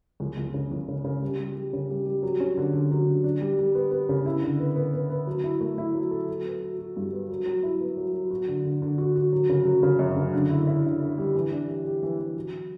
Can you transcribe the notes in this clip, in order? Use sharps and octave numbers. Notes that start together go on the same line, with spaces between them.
C#2
C#2
C#3
C#2
C#3
C#3
G3
G3
G3
C#3
G3
G3
F#3
C#4
D3
D3
F#3
D3
D4
G3
G3
B3
B3
C#3
E4
D3
B3
B3
B3
B3
F#3
E4
A3
E4
F#3
A4
F#3
B3
F#4
F#4
G2
B3
F#3
F#3
E4
B3
F#3
F#3
F#4
D3
D3
D3
F#4
F#4
F#3
C#3
F#3
C#3
F#2
C#3
D3
E4
E4
D3
D3
G3
E3
D4
G4
G4
E3
E3
F#3